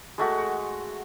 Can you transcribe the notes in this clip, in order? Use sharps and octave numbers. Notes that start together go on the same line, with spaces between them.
G#3 A3 F#4